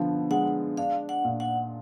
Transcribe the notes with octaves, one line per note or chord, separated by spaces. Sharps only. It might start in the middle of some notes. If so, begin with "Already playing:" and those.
Already playing: D3 F3 B3
G#3 F#5
D4 F5
F#5
A#2
F#5